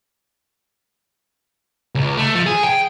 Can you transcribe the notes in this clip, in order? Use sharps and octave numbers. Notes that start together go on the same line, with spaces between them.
C#2
A3
F3
G#4
G5